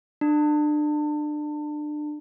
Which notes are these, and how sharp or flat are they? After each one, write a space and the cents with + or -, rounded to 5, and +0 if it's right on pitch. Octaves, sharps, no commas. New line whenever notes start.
D4 +30